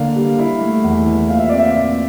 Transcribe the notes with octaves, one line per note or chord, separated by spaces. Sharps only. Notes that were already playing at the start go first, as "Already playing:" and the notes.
Already playing: D3 A#3 D4 F5
G3
E4
A3
E2
E3
A#2 F5
E5
C4 D5
E5
A#2